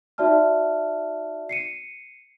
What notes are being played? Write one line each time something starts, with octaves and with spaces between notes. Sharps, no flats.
D#4 F#4 D5 E5 A5 F6
C7 C#7 D#7